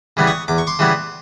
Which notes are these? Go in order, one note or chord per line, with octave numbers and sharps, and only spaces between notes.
C#3 E3 G3 B3
C#6 D#6
E2 D6
C#6
C6 D6
C#3 E3 G3 B3